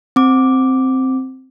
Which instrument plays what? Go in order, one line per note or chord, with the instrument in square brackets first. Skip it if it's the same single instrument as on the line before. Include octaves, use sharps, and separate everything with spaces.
[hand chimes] C4 D6